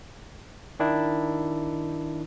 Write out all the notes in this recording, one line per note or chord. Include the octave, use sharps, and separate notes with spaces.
D#3 D4 E4